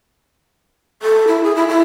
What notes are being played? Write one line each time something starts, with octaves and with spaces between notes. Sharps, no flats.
A4
E4
G#4
E4
E4